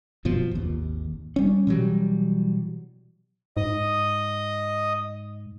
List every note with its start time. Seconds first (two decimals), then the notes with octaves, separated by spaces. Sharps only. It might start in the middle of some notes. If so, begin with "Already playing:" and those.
0.25 F#2 B2 F3
0.51 G#1 D#2
1.36 G3 C#4
1.67 B2 E3 F#3 G3
3.57 G#2 D#5 D#6